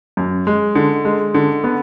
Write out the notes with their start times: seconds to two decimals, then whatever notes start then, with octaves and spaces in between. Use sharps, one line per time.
0.17 F#2
0.47 G#3
0.75 D3
1.05 G#3
1.34 D3
1.64 B3